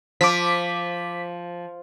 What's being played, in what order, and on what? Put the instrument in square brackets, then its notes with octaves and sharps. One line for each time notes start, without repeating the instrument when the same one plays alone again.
[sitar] F3 [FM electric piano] D6 B6